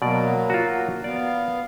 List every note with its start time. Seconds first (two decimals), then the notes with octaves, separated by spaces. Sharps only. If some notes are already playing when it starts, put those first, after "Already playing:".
0.02 B2 F#3 A#3 D5
0.50 F4 F#4
1.04 B3 D5 F5